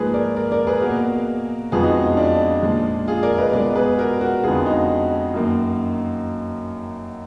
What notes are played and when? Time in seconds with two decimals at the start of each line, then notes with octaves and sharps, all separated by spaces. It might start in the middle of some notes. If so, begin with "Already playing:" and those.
Already playing: G#2 F3 A#3 G#4 B4
0.14 A#4 D5
0.36 A#4 D5
0.52 A#4 D5
0.67 G#4 B4
0.81 B2 A#3 F#4 A#4
1.72 F2 F3 G#3 B3 F4 G#4
1.83 D#4 F#4
1.95 D#4
2.06 D#4
2.17 D4 F4
2.63 A#2 F3 G#3
3.08 F4 G#4
3.23 A#4 D5
3.38 B4 D#5
3.53 B2 G#3 B3 A#4 D5
3.75 G#4 B4
3.98 F#4 A#4
4.20 F#4 A#4
4.43 F2 D3 G#3 B3 F4 G#4
4.66 D#4 F#4
5.34 F#2 D#3 A#3